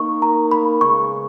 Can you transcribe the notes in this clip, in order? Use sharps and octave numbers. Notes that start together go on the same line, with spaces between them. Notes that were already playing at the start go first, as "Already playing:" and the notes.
Already playing: A#3 D#4 A#4 C#6
A#5
B5
C#3 G#3 B3 C#6